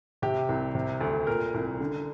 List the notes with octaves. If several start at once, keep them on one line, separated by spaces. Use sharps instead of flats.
C3 G4
C2
C3
D2
A#2 A#4
C2
D3